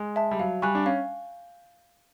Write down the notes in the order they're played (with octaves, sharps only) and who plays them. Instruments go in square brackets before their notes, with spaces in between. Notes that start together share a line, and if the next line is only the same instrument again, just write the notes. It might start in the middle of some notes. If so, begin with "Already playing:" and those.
Already playing: [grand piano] G#3
[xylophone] E5 A5
[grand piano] G3
[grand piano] F#3 [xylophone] F5
[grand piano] G3 [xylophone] G#5 C#6 F#6
[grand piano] D4
[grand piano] C#4 [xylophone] F5